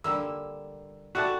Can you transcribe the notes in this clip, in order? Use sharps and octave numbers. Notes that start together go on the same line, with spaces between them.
D3 G3 A#3 E6
G3 A3 F#4 D5 A5